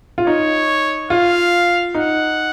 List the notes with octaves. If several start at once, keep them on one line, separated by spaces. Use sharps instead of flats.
F4
D#4 C#5
F4 F5
D#4 F#5